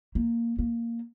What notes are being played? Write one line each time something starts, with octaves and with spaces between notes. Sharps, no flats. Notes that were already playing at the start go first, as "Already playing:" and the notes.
A#3
A#3